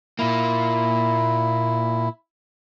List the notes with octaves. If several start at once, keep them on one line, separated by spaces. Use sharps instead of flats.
A#2 A#3 E4